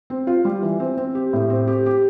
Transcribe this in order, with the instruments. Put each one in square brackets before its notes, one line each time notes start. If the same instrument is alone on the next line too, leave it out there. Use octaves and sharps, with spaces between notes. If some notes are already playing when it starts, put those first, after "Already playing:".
[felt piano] C4
F4
G3
E3
C4
C4
G4
A2
C4
G4
G4